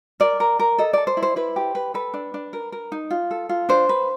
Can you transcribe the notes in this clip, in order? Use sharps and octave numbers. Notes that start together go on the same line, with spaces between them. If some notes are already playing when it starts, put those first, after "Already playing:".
A#4 D5
A#4
A#4
A4 D#5
A4 D5
C5
E4
C5
E4 B4
G4
B4
A4 B4
D4
D4
A#4
A#4
D#4
F4
A4
F4
D4 C5
B4